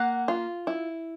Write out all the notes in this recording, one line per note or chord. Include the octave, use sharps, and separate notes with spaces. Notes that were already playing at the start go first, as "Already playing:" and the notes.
Already playing: A#3 F#5
F4
E4